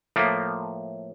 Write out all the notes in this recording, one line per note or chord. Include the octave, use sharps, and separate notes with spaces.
A2 F3 A3 A#3